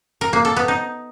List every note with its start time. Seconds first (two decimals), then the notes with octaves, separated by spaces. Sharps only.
0.21 A#4
0.33 A#3
0.45 A4
0.56 B3
0.68 D#4